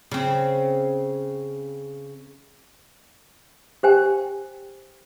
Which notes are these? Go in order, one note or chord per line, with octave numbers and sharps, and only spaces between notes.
C#3 C4
G4 C5 G5 G#5